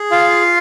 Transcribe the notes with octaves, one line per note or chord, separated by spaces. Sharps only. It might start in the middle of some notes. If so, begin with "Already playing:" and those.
Already playing: G#4
F4 F5